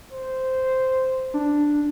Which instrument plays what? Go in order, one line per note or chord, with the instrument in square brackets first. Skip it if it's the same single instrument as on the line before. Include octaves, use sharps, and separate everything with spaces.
[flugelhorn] C5
[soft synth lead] D4